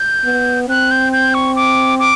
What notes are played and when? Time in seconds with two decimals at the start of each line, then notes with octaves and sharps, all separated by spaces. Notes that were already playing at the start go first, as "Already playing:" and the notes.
Already playing: G6
0.25 B3
0.69 C4 F#6
0.91 G6
1.13 G6
1.34 C#6
1.56 D6
1.99 D6